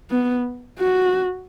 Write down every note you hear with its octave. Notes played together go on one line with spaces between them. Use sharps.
B3
F#4